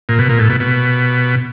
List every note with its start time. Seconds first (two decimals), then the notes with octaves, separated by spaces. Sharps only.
0.09 A#2
0.19 B2
0.29 A#2
0.39 A2
0.50 B2
0.60 B2